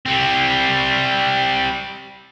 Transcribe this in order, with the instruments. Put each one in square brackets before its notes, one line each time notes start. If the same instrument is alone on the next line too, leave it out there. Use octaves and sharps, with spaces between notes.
[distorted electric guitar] G3 C4